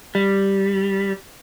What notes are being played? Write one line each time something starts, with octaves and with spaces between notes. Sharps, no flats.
G3